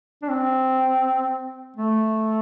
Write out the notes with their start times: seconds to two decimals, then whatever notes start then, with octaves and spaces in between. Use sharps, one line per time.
0.22 D4
0.30 C4
1.76 A3